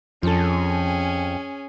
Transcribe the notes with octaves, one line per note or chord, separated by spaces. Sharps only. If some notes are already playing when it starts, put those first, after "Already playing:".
F2 F3 C#4 G#4 A4